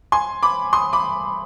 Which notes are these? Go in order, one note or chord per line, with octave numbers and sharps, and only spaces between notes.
G#5 C6
B5 D6
C6 D#6
B5 D6